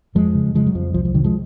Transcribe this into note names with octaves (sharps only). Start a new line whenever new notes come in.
F2 F3 G#3
C#3
C#3 F3 G#3
F#3
F2 F3
C2 F3
F3
C3 D#3 F#3
F3 G#3